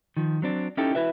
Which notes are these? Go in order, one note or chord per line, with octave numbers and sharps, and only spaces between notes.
D#3 F3
F#3 C4 D4
C#4 D#4 E4 G4 A4
E4 F#4 B4 E5